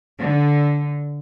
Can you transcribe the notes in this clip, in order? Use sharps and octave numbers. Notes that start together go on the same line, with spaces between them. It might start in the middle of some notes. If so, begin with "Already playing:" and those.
D3